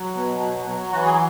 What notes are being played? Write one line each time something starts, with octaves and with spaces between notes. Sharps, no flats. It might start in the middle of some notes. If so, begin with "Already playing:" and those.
Already playing: F#3
B2
F#3
F#3
E3 F#4
G#4